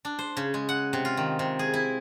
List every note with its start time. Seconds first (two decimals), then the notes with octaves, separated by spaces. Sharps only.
0.05 D4
0.19 C5
0.37 C#3
0.54 G#3
0.69 F#5
0.93 C3
1.05 F4
1.17 D#3
1.39 C3
1.59 G#4
1.74 E4